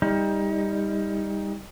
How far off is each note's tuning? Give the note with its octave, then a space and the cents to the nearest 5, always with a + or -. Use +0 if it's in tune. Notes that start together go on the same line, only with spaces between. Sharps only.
G3 +25 D#4 +25